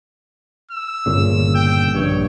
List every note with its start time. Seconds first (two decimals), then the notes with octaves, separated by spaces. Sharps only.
0.71 E6
1.06 G1 A#2 C#3
1.55 G5
1.95 A#1 G2 C#5